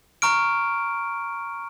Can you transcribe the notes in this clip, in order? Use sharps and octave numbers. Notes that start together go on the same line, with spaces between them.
A#5 C#6 F6 D7